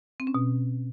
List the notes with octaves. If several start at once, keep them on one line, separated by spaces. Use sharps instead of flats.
C4
C#4
B2